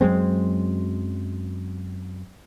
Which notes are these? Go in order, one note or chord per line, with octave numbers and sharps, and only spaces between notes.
F#2 F#3 G#3 C4